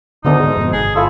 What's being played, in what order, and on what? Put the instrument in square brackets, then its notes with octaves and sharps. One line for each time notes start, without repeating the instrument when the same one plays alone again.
[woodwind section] D2 [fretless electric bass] D3 D#3 B3 [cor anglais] D#4
[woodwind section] G#2
[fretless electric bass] F2 B2
[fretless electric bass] G1 [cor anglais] G#4
[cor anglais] E4 [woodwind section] F4 A4